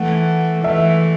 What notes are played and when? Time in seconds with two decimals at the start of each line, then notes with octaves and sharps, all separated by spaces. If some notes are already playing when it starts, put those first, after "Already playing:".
Already playing: E3 A3 F#5
0.63 E3 A3 E5